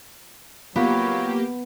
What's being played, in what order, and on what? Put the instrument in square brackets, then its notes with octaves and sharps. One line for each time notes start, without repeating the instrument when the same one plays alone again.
[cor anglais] F#3 [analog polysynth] A#3 G4 [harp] B3 [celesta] F4 F5